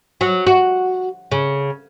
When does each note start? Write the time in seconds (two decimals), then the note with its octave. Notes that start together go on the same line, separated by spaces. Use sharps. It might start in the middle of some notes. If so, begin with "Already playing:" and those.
0.21 F#3
0.47 F#4
1.31 C#3